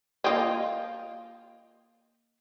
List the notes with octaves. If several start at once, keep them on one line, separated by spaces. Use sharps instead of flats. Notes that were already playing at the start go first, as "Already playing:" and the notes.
A#3 F4 D#5 G5